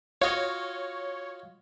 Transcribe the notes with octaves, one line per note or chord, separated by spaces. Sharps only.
F4 F#4 C#5 D#5